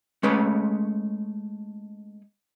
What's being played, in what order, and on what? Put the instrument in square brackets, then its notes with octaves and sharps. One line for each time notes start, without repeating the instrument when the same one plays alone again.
[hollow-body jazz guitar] G#3 A3 C#4 B4 C#5